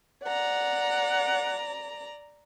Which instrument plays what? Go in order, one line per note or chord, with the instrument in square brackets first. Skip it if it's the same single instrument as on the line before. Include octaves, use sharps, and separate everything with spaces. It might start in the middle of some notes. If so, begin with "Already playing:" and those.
[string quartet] D5 A#5 [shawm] F#5